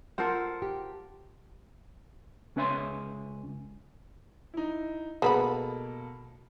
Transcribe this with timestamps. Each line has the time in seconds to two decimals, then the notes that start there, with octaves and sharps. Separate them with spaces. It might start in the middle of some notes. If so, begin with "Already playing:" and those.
0.18 F4 A4 A#4 C5 F#5
0.62 G4
2.56 C#2 C#4 B4 E5 G#5 C6
4.54 D#4 E4
5.22 B2 G#3 A#3 B3 A4 B5